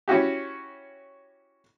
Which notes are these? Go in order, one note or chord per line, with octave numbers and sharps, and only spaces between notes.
C#4 E4 F#4 G4